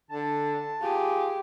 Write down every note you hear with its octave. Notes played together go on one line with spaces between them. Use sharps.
D3 A5
F4 G4 G#4